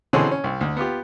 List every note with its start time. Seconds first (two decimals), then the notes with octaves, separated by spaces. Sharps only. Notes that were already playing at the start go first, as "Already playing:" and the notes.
0.13 B2 D3 E3 C4 C#4 G#4
0.31 C#4
0.44 C2
0.61 D2
0.77 B3 F4 G4